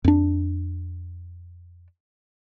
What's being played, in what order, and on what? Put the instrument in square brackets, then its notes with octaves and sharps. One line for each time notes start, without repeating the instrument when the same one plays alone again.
[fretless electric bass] F2 D4